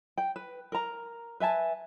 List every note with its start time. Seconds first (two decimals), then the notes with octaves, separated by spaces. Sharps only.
0.17 G5
0.36 B4
0.72 A#4 A#5
1.40 B4 E5 G#5 A5